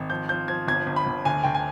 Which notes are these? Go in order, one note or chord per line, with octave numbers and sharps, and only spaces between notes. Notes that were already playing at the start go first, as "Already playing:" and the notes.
Already playing: G#1
F3 G6
F3 G6
F3 G#6
G1 G#6
G1
B5
G1
D2 G#5
D2 G5
G#5